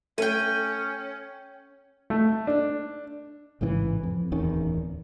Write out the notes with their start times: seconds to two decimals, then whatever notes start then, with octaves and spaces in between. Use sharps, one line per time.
0.18 A3 C#4 G5 G#5
2.10 A3
2.47 D4
3.61 A1 G#2 C#3 E3
4.03 F2
4.32 D1 E2 D#3 C#4